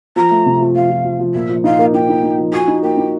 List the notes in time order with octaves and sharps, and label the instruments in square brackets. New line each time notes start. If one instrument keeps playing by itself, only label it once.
[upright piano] F3 [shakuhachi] A#5
[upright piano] A3
C3
F3
[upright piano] F3 [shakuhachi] F5
[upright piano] F3
F3
F3
[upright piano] A#2 [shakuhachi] E5
[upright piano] F3
[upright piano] D#4 [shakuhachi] F5
[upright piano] A#3
[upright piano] D#4 [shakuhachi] G5
[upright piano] D#4
D#4
F3
[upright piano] F#4 [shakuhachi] G#5
[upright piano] D#4
[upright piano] A#3 [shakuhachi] G5
[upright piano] D#4